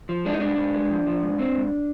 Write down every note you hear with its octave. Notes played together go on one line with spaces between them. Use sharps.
F3
G#3 D4
D#4
G#2 D4
G#2
G#3
F3
F3
G#2
C4
G#2